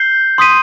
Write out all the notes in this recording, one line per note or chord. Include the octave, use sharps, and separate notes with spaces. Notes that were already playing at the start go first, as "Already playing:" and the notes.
Already playing: G6 C7 G7
C6 D#6 B6 D#7